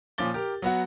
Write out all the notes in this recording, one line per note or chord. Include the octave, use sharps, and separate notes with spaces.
A#2 F3 C#4 D6 A6 G7
G4 A#4
F#3 B3 F#4